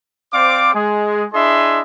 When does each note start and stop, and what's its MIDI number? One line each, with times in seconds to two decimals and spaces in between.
0.33 0.74 60
0.33 0.74 72
0.33 0.74 74
0.33 0.74 77
0.33 0.74 86
0.74 1.25 56
0.74 1.25 68
1.33 1.81 62
1.33 1.81 64
1.33 1.81 68
1.33 1.81 75
1.33 1.81 76
1.33 1.81 84